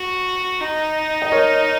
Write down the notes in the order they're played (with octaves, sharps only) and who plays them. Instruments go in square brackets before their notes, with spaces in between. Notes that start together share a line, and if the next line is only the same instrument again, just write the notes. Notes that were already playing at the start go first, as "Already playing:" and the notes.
Already playing: [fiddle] F#4
D#4
[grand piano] D#5
A#4 C#5